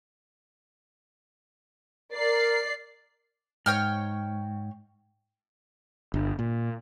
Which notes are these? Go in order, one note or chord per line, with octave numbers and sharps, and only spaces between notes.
A#4 D5 C7
G#2 C#5 G5 F6
G1
A#2